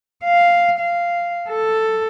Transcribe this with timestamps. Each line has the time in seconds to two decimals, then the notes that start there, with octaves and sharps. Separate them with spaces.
0.24 F5
0.79 F5
1.48 A4